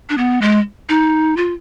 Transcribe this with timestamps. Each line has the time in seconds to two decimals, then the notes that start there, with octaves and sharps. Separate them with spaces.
0.10 D4
0.18 B3
0.41 G#3
0.89 D#4
1.37 F4